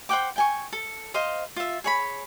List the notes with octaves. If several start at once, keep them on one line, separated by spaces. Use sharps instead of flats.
C5 F#5 G5 D6
G5 G#5 C#6
A4
C5 D#5 F5 C6
F4 E5
G#4 C#5 B5